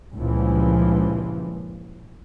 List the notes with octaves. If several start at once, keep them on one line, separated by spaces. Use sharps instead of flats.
C#2 G2 A#2 E3 F3